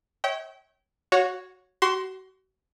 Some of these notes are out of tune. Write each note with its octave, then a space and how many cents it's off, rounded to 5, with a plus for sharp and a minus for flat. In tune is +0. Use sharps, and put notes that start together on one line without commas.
C#5 -15 E5 -35 G5 -30
F#4 +0 C#5 +0 F#5 -40
F#4 +35 C6 +0